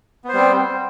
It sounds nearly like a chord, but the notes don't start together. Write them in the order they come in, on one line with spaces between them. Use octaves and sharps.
B3 C5 G3 C4